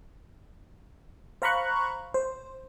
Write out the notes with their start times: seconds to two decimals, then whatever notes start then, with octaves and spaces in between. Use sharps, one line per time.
1.42 C5 F5 A#5 B5 C#6 F#6
2.14 C5